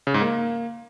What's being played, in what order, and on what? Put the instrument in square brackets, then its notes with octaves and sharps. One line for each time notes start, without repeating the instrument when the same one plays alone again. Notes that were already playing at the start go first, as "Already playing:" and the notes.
[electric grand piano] C#3
G#2
A#3